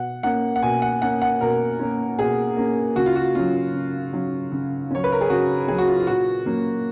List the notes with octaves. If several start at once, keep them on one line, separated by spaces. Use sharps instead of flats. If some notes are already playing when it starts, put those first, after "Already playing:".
Already playing: B2 F#5
A#3 C#4 F#5
F#5
B2 G#5
F#5
A#3 C#4 F#5
F#5
B2 A#4
A#3 C#4
B2 G#4
A#3 C#4
C#3 F#4
F4
F#4
F#3 C#4 F4
C#3
F#3 C#4
C#3
F#3 C#4 C#5
B4
A#4
G#4
C#3 F#4
F#3 C#4 G#4
F#4
F4
F4
A#2 F#4
F#3 A#3 C#4